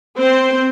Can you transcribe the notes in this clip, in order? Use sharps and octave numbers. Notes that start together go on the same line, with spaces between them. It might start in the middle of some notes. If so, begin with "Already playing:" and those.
C4 C5